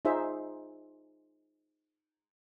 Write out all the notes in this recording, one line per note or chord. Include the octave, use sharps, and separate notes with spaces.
D#4 F4 G#4 C5 D5 E5